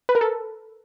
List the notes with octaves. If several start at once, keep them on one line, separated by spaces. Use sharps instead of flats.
B4
A#4
A4